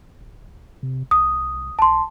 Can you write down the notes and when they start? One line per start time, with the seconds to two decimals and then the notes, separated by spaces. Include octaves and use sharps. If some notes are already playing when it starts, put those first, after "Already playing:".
0.21 D1
0.83 C3
1.11 C2 D#6
1.79 B1 A5 C6